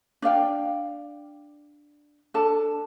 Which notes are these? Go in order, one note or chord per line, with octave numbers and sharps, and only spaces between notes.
D4 D5 F5 G5
D4 A4 A5